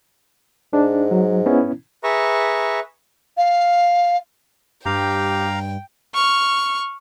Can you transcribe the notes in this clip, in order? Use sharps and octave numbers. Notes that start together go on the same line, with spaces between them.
G#2 D4
F#3
B3 C#4 E4
G#4 B4 E5 A#5 C#6
F5
G2 G4 F5 G5 A#5
C#6 F6